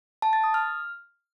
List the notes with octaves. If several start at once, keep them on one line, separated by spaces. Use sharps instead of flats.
A5
A6
D#6
F6